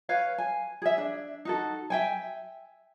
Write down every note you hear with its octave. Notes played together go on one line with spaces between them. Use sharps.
B4 C#5 F5
G#5
G#4 E5
D4
D#4 F#4 A4
E5 G5 G#5